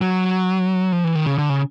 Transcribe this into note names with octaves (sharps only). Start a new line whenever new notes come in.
F#3
F3
E3
D#3
C#3
D3
C#3